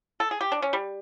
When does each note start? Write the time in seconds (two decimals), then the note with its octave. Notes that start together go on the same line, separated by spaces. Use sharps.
0.20 A4
0.31 G#4
0.41 G4
0.52 D4
0.62 C#4
0.73 G3